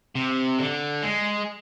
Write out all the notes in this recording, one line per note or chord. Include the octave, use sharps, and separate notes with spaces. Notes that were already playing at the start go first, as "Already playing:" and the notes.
C3
D3
G#3